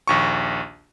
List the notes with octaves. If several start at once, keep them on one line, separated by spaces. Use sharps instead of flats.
A#1 D#2 C#6